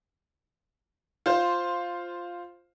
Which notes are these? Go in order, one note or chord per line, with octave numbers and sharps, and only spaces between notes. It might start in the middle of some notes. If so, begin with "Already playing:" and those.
F4 C5